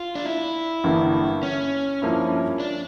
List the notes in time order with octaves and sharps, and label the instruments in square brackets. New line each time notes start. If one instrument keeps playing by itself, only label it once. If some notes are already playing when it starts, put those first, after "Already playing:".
Already playing: [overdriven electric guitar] F4
D4
E4
[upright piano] G1 G2 E3 A#3
[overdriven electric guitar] C#4
[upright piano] G2 F3 A#3 E4
[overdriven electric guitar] D4